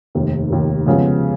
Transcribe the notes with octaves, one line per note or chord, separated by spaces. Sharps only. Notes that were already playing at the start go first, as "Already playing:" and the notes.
F1 D#2 D#3
F1 D#2 D#3
F2 C#3 G#3 B3